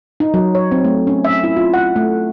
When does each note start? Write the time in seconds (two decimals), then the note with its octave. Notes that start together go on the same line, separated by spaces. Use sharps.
0.20 D#4
0.34 F#3
0.55 C#5
0.72 C4
0.84 A3
1.07 C#4
1.25 E5
1.44 E4
1.56 F4
1.74 F#5
1.96 A3